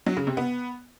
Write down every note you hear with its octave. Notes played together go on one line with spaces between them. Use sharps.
F#3
C#3
C3
B3